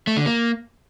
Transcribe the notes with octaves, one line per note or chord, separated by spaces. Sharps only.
A3
D3
A#3